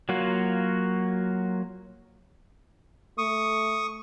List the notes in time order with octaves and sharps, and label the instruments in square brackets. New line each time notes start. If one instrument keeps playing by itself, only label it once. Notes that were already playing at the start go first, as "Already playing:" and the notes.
[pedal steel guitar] F#3 A#3 F4 F#4
[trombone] A3 [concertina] C#6 D#6